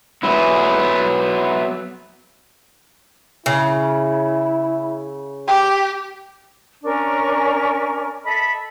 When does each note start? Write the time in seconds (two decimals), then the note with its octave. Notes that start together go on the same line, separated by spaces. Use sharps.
0.23 F#3 B3 E4
3.46 C#3 E4
5.47 G4 G5
6.84 C#4 D4 A#4 C#6
8.24 A4 D#5 E5 B5